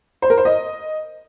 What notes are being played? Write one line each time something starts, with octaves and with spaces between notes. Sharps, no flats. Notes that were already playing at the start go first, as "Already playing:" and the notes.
C5
A#4
C5
D#5